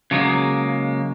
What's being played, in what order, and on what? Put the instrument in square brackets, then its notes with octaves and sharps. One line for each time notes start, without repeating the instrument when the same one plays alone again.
[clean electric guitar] C#3 F#3 G#3 A#3